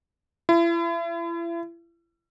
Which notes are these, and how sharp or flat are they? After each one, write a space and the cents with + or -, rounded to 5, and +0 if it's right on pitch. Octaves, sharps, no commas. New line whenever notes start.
E4 +40